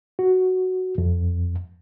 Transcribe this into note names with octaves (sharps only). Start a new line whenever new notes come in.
F#4
F2